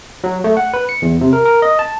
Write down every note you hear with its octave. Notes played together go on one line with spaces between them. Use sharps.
F#3
A3
F#5
B4
C#7
E2
C3
A#4
A#4
D#5
A5